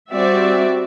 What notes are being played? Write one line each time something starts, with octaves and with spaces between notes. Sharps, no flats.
G3 C4 F#4 D5 E5